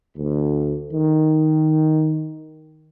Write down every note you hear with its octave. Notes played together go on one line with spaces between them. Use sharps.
D2
D#3